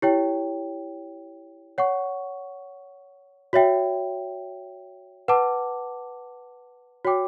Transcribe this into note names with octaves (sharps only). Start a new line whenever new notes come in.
E4 G4 C#5 G5
C#5 F#5 C#6
F#4 C#5 E5 G5
B4 F#5 A5 D6
F#4 C#5 G5 D6